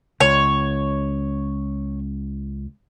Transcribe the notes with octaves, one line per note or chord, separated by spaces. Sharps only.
C#2 C#5